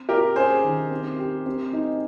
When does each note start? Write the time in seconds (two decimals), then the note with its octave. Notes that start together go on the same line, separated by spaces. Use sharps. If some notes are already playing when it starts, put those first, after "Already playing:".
Already playing: C4
0.09 F4 G4 A#4
0.36 C#4 G#4 C5
0.64 D#3
0.91 C4
1.19 G4
1.46 C4
1.73 D#4